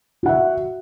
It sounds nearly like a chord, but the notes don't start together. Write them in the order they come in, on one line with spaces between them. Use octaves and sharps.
F#4 F#5 E5